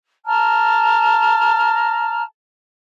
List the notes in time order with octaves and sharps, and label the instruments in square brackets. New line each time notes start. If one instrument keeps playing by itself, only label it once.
[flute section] A5 A#5 F6